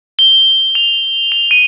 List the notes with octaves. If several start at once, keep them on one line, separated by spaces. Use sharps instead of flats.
G7
F7
F7
D#7